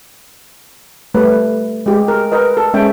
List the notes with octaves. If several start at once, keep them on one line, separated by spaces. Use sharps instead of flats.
G3 A3 B4
G#3 G4
A#4
A#4 B4 D#5
A4
G#3 C#4 E5 G5